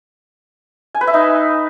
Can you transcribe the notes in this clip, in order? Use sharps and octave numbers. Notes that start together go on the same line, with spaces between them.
G#5
B4
E5
D#4